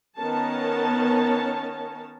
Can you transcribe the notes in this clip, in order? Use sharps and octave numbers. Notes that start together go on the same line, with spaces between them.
D#3 B3 C#4 A#4 C#5 A5